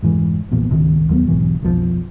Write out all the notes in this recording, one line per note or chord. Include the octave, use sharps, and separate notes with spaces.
F1 G#2 E3
A#1 E2 A#2
G#1 C#2 C3 D#3
D#2 F#3 B3
B1 G#2 E3 F#3
B1 F2 E3 F3